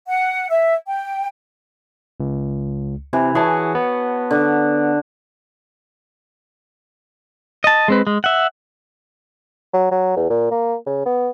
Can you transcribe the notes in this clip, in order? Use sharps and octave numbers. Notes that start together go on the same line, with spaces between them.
F#5
E5
G5
C#2
C3 E3
E3 F#4 G#4 C#5 A5
B3
D3
D#5 A5
G#3 C4 B4
G#3
E5 F#5
F#3
F#3
E2
A#2
A#3
C#3
B3